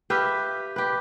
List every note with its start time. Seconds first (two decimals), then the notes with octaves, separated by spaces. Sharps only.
0.10 G4 B4 E5 F5
0.76 G4 B4